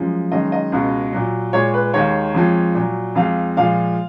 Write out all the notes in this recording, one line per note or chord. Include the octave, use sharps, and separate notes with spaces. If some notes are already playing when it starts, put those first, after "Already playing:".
Already playing: F#2 F3 G#3
F#2 D#3 G#3 D#5
D#5
C#2 B2 G#3
A#2 F#3
A#2 G#3 C#5
B4
D#2 D#3 G#3 C#5
F2 F3 G#3
A#2 F#3
F2 F3 G#3 F5
A#2 F3 G#3 F5